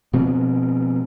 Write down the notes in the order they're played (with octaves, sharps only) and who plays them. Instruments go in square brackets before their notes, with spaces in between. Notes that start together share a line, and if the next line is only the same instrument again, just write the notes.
[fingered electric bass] B2 F3 C4